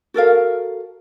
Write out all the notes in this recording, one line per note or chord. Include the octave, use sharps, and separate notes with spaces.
F#4 A4 A#4 F5